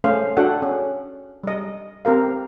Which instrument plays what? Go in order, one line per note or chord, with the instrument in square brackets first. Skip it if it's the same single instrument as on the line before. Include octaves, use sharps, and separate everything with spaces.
[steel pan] A3 C#4 C5 F5
D4 F#4 A4 F#5 G5
C#4
G3 D#5
C4 G4 A#4 F5